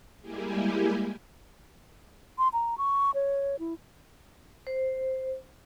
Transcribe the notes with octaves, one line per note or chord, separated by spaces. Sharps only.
G3 G#3 A#3 E4 G4 G#4
C6
A#5
C#6
C#5
E4
C5